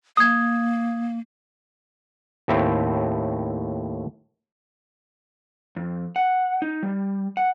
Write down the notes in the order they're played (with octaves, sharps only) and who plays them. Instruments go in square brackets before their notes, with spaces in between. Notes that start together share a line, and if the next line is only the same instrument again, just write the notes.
[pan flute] A#3 [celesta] D#6 G#6
[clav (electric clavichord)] D#2 A2 A3 C4 E4
[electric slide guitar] F2
F#5
D#4
G3
F#5